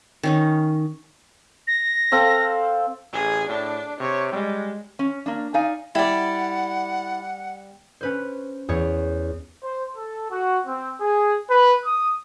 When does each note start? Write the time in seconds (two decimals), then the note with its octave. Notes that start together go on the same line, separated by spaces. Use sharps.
0.23 D#3 C#4 D#4
1.67 A#6
2.12 C4 A4 F5
3.13 A1 G#4
3.49 A2 D4
4.00 C3 C#5
4.33 G3 G#3
4.99 C#4
5.26 A#3 D4
5.54 D#4 D5 F5 G#5
5.95 G3 E4 D5 F#5
8.01 C#4 B4 C5
8.69 E2 C#5
9.63 C5
9.96 A4
10.31 F#4
10.67 C4
11.00 G#4
11.49 B4
11.85 D#6